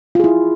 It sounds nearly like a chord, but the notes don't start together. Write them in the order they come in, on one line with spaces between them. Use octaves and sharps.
F4 G#4 E4